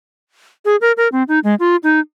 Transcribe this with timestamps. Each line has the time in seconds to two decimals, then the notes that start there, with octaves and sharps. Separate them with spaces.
0.65 G#4
0.81 A#4
0.97 A#4
1.12 C4
1.28 D#4
1.44 G#3
1.60 F4
1.83 D#4